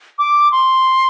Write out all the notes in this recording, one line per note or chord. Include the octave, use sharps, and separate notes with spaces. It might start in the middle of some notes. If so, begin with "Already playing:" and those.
D6
C6